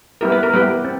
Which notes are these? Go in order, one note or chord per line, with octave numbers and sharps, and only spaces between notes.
G3 B3 E4 G4 A#4
B4
A#4
G3 B3 E4 G4 B4
C4